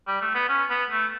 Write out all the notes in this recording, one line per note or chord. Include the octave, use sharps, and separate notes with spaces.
G3
A3
B3
C#4
B3
A3